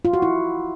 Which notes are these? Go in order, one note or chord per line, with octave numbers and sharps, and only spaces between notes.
F4
F#4
E4